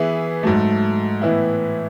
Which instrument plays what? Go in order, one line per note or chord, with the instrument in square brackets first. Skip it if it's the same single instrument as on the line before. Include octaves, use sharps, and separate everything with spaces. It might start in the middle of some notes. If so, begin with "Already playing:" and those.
Already playing: [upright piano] E3 B3 E4 G#4
G#2 F#3 A3
A2 E3 B3 E4